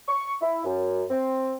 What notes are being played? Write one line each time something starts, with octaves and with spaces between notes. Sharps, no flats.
C#6
E4
F#2
C4